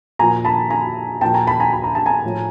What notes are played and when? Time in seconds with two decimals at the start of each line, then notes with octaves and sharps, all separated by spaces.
0.19 A#2 F3 G#5 A#5
0.45 A5 B5
0.70 G#5 A#5
1.21 A#2 F3 G5 A5
1.34 G#5 A#5
1.47 A5 B5
1.60 G#5 A#5
1.73 B5
1.84 A#5
1.95 A5
2.06 G#5 A#5
2.24 A2 F3